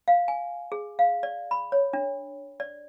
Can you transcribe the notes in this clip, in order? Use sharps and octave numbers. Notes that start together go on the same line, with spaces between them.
F5
G#5
G#4
F5
D5
B5
C#5
D4
D5